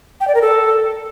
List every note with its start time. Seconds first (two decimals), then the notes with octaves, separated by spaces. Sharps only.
0.20 G5
0.28 D5
0.35 A#4
0.42 A4